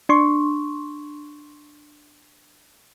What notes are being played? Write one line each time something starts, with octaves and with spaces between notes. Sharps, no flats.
D4 C6 C#6